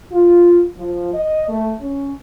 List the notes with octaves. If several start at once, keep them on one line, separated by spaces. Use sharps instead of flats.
F4
F3
D#5
A3
C#4